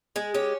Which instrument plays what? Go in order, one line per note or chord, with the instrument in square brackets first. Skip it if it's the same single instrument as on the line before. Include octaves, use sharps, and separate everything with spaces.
[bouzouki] G#3 G#4
C#4 G4